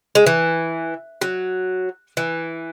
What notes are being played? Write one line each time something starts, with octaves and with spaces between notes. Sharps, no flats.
G#3
E3
F#3
E3